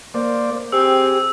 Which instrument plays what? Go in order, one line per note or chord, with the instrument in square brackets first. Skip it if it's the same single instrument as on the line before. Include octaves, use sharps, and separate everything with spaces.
[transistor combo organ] A#3 C5 D5
[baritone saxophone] C4 [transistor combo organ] G4 G#4 [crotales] E6